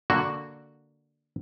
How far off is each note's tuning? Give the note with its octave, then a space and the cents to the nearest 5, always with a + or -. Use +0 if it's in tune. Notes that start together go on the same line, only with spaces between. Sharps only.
D3 +0 A#3 +0 F#4 +0